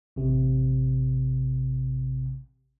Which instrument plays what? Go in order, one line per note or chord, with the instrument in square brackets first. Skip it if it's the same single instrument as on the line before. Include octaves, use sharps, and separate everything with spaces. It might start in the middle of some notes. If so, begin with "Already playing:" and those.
[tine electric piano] A1 C3